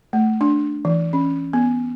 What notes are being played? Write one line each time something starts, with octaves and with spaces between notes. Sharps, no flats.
A3
D4
E3
C#4
B3